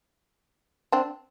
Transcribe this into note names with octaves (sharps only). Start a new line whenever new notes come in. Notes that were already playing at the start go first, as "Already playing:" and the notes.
C4 D4